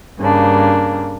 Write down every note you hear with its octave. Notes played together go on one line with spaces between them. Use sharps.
G2 C#3 A#3 D4